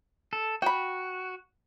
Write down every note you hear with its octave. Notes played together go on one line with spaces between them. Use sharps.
A4
F#4 G5 B5